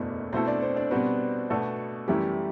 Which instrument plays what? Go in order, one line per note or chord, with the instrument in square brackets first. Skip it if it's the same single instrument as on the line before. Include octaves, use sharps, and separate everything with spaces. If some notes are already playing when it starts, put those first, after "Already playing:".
Already playing: [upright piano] F#1 E2 B2 A3 E4 [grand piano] D4
[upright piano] B2 A3 E4 A4 [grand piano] C4 C5
[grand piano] D4 D5
C4 C5
D4 D5
[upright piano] B2 G3 C4 F#4 [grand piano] B3 B4
[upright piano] B2 A3 D4 F#4 A4
[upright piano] F#2 E3 A3 E4 [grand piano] G3 G4